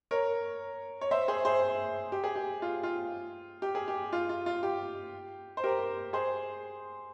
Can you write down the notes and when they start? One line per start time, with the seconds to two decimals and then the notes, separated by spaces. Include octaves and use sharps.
0.11 A#4 C#5
1.01 C#5
1.11 C5 E5
1.28 G#4 C5
1.45 G#4 C5
2.12 G4
2.24 G#4
2.36 G4
2.62 F4
2.83 F4
3.62 G4
3.75 G#4
3.88 G4
4.13 F4
4.29 F4
4.46 F4
4.63 G4
5.57 C5
5.64 G4 A#4
6.13 G#4 C5